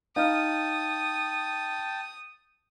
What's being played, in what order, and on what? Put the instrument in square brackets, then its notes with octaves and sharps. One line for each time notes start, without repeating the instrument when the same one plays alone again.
[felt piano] D#4 [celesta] F5 F6 [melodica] G5 A5 [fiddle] D#6